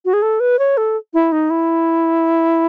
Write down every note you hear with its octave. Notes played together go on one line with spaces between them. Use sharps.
F#4
G#4
A4
B4
C#5
A4
E4
D#4
E4